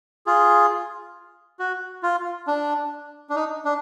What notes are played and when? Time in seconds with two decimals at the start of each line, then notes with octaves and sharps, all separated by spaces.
0.26 F4 G#4
1.59 F#4
2.03 F4
2.47 D4
3.29 D4
3.36 D#4
3.65 D4